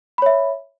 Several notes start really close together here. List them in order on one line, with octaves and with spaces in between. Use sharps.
B5 C#5 E5